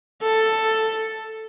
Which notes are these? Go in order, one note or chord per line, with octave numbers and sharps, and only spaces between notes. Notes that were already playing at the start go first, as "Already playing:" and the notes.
A4